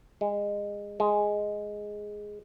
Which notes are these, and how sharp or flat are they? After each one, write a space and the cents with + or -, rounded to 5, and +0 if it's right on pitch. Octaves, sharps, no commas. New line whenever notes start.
G#3 -25
G#3 +0